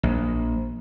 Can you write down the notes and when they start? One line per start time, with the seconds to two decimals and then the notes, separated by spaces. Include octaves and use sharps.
0.03 A#1